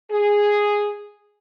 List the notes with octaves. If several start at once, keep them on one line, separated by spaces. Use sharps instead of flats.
G#4